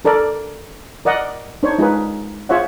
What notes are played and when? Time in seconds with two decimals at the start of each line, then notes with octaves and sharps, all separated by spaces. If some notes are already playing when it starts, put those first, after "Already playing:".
0.05 D4 A4 A#4 D5
1.05 A#4 D5 D#5 F#5
1.63 D4 D#4 C5 C#5
1.78 G#3 D#4 F4 G#4 A#4 B4
2.49 F4 G#4 C5 C#5 E5 F#5